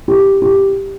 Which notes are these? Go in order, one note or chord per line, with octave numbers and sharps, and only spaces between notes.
G4
G4